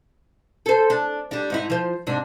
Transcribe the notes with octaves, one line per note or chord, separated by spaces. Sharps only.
A4 C5
D4
G3 D4
G#2 D#4 E4
F3 C5
G#2 C3 D4